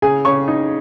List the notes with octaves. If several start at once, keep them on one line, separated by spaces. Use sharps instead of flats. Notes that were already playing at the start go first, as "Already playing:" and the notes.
C#3 G#4 G#5
C#3 C#5 C#6
D#4